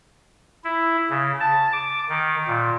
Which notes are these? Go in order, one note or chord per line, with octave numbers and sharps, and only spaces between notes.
E4
C#3
A5
D6
D#3
A#2